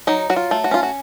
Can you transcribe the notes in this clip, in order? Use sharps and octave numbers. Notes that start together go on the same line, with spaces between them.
F#3 D#4
F#3 F#4
F4
A3
F#4
C#4 F4
F#4